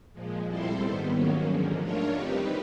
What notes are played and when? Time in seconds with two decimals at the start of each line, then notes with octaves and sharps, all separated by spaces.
0.13 A#2 F3 G#3
0.46 G3 C4 E4 A4 C5
0.80 G#2 D#3 G3 B3
1.13 G#2 D#3 F#3 A#3 C#4
1.46 D3 F3 G#3
1.80 A3 D4 F4 A#4 C#5
2.13 G3 C4 D#4 G4 B4